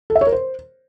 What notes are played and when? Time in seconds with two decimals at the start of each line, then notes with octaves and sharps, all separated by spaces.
0.10 A4
0.16 E5
0.21 C#5
0.27 A#4
0.33 C5